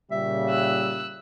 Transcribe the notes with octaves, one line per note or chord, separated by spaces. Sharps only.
A#2 C#3 G3 E5
E6 F#6